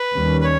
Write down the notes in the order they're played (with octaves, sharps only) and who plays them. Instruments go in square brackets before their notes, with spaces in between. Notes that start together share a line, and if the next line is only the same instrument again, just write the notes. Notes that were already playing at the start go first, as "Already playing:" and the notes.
Already playing: [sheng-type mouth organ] B4
[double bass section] D#2 D#3 G3 C#4
[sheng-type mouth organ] B4
C#5